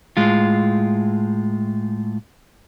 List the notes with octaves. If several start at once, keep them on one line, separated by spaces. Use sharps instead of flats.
A2 G#3 F4